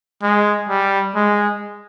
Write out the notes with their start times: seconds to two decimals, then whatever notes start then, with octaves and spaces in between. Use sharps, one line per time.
0.23 G#3
0.69 G3
1.15 G#3